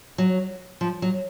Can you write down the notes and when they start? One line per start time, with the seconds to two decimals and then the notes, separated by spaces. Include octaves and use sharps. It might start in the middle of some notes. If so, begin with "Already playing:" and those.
0.18 F#3
0.81 F3
1.02 F#3